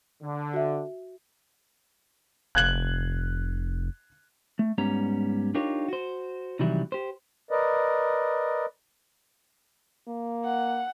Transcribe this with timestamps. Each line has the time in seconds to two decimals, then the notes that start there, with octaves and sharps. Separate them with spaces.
0.22 D3
0.54 F#4 E5
2.55 F1 F#6 G#6 F#7
4.59 A3
4.78 G#2 G3 B3 C#4 A#5
5.55 D4 D#4 F4 G4 A#4 C#5
5.88 F#4 C5
6.59 C3 D#3 E3 F#3 G3 E4
6.92 G4 C5
7.51 A#4 B4 D5 D#5
10.08 A#3
10.45 F#5